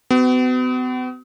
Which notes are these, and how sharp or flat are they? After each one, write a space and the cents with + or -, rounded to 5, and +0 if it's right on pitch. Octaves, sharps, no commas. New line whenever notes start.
B3 +40 F#4 +30